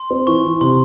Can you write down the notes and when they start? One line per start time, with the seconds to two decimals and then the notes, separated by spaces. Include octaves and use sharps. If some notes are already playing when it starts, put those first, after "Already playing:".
Already playing: C6
0.11 C4
0.27 E3 C#6
0.45 E3
0.61 C3 C6